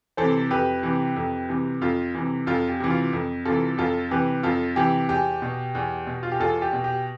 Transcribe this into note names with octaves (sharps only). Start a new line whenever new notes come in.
C3 E3 A4 C5
F2 G4 B4
C3 E3
F2
C3 E3
F2 F4
C3 E3
F2 F4 A4
G4
C3 E3
F4
F2
C3 E3 F4 A4
F2 F4 A4
C3 E3 G4 B4
F2 F4 A4
C3 E3 G4
E2 G4
B2
E2
B2
F4
G4
E2 F4 A4
G4
B2
G4